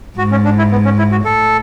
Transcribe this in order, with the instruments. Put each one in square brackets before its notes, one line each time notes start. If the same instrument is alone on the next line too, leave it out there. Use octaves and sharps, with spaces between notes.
[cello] G#2 [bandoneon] F#4
[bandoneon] C#4
D4
E4
B3
C#4
E4
F#4
[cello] A2 [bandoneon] A4